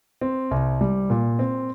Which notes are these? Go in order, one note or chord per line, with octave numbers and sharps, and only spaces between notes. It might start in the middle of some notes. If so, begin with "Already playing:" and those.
C4
C2
G3
A#2
C4